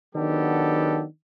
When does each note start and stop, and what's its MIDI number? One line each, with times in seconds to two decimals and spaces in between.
0.15 1.04 51
0.15 1.04 54
0.15 1.04 59
0.15 1.04 62
0.15 1.04 67
0.15 1.04 69